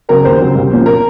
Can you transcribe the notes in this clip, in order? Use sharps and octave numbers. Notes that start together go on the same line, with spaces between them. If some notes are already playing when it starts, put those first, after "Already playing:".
C#3 F#3 C4 A#4
D#2 C5
C#3 F#3 C4
C2
A#2 F3 A#3 C#4
A#4